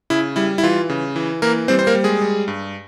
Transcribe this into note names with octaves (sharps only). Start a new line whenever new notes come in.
C#3 E4
G3 E4
E4
E3 F4
C#3
E3
E3 A#3 A#4
G3 C4 C5
C5
A#3 A#4
G3
G#3 G#4
G3
G2